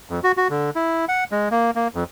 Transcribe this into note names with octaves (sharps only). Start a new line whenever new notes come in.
F2
F#4
F#4
D3
E4
F#5
G#3
A#3
A#3
F2